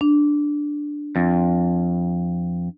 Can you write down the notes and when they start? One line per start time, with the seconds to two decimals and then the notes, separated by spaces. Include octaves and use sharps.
0.01 D4
1.16 F2